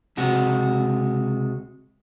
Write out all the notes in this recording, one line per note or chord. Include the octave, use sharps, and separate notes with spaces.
C#2 C3 G#3 F#4